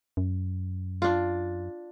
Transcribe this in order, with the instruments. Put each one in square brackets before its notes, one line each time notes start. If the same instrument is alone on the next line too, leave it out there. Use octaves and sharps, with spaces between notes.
[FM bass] F#2
[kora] D4 F4